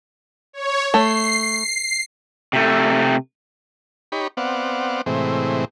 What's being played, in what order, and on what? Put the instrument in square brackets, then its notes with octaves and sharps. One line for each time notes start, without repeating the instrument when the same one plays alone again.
[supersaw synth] C#5
[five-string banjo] A3 [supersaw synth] C7
[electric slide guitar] C3 A3
[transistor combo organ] D#4 G4 C#5 B5
B3 C4 D5 F5 F#5
A2 C3 E3 G#3 C4